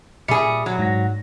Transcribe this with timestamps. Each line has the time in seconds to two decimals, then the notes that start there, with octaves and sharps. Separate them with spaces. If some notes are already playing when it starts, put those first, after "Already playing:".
0.28 A#2 G3 G#4 E5 C#7
0.66 F#3
0.79 G#2 F#5 A#6